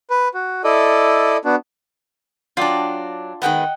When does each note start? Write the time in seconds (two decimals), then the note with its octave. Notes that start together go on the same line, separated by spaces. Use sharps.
0.10 B4
0.34 F#4
0.64 E4 A4 D5 D#5
1.45 B3 D4 F#4
2.57 F#3 D4 F4 D5 G5
3.42 D#3 G#3 B3 D#5 F#5 G5